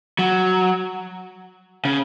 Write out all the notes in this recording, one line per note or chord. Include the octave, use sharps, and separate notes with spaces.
F#3
C#3